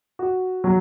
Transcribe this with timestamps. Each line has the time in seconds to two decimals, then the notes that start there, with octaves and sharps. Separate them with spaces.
0.19 F#4
0.64 F#3